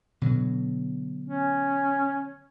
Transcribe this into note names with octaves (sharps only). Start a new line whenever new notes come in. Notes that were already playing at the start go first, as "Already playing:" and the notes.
B2 D3 F#3
C#4